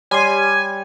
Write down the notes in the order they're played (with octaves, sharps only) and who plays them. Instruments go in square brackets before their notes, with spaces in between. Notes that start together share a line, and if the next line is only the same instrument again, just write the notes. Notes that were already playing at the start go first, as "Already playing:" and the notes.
[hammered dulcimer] G3 [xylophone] C#5 C6 C7 [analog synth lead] G#5